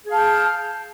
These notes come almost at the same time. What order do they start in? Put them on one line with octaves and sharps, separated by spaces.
G#4 F5 A5 G5